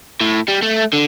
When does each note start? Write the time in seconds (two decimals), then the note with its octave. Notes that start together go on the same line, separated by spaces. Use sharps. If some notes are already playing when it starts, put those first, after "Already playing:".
0.21 A2
0.48 G3
0.62 A3
0.93 D3